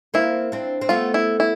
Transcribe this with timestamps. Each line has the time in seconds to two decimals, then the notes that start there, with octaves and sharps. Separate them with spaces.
0.14 A#3 C4 E4
0.52 C4 D4
0.81 C4
0.89 A3 B3 F4
1.14 E4
1.40 E4